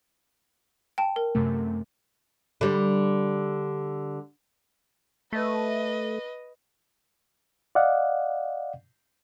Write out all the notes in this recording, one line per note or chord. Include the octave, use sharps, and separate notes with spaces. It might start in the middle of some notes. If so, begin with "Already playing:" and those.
G5 A5
A#4
F#2 C3 A3
D3 G3
A3 B4 D#5
D5 D#5 F5 F#5